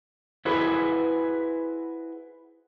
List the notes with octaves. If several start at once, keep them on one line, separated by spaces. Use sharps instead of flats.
E4 F#4 G#4 B4 C5